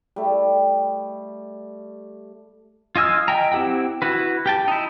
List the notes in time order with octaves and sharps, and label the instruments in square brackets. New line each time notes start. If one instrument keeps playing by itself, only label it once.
[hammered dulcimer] G3 A3
[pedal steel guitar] F4 D#5 G#5 E6 F6
D#5 E5 G5 G#5 A#5
C4 E4 G4 F#5 G5
E4 F#4 B4
G4 G5 A5
D#4 E4